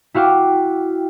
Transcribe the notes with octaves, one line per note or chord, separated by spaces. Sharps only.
E4 F#4 F5 G5 D6